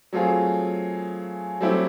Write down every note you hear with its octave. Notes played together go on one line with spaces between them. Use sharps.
F#3 A3 C4 F4 G#4
F#3 A3 C4 E4 G4